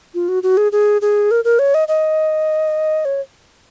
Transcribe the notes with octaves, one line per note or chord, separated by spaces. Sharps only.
F4
F#4
F#4
G#4
G#4
G#4
A#4
A#4
C#5
D#5
D#5
C#5